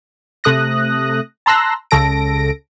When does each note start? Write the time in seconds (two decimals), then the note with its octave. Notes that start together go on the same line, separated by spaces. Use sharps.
0.44 C3 A3 D#6 F#6 A#6
1.46 A5 A#5 C6 E6 F#6 A#6
1.91 C#2 C#3 A4 A#6 D7